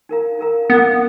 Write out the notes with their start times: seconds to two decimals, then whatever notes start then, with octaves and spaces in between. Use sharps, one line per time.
0.09 D#4 A#4 F5 A#5
0.39 D#4 A#4 F5 A#5
0.70 B3 D#4 A#4 F5 A#5